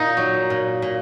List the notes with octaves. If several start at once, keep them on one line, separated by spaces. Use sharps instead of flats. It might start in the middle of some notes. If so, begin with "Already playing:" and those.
Already playing: A#2 D#4
F#3
A#2
A#2